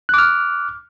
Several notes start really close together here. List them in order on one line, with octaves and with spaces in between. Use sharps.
F#6 D6 F6